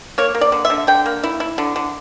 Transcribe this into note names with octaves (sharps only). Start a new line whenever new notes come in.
A#3 C#5
A#3
D5
D3
E5
D3
D3 G5
A#3
E4
E4
D3
D3